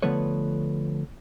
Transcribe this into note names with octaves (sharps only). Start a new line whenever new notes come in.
D3 F3 A3 B3 B4 C#5